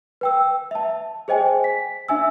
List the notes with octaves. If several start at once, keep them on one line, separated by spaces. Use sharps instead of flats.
B4 G5 E6
E5 A5
G#4 C5 D#5 G5 G#5
B6
D4 E5 G#5 E6